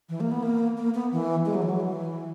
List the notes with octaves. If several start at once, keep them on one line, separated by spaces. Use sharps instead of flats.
E3
A#3
B3
A#3
A#3
B3
E3
G#3
F#3
E3
F#3
E3